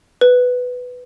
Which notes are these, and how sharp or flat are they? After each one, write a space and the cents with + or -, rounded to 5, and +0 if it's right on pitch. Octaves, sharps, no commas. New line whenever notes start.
B4 +5